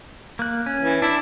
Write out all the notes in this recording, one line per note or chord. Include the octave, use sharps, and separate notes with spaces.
A#3 F#6
C#4
E3
D4 E4